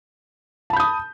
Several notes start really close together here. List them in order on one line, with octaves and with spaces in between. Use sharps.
A5 B5 G6 D#6